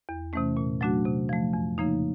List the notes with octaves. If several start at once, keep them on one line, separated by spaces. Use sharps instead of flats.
E2
C3 E3 A3 C#4
A#2
F#3 A3 D4 F#4
C3
F3 A3
F2
C#3 F3 A#3 D#4